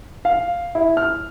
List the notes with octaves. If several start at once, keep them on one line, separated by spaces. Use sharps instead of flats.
F5
E4
F6